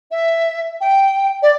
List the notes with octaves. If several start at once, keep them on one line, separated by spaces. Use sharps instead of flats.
E5
G5
D5